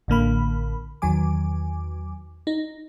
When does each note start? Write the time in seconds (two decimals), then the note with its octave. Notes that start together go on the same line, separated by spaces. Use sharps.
0.08 A1 D3 A#3 B5
1.02 E2 D#3 F#3 G#5 D6
2.47 D#4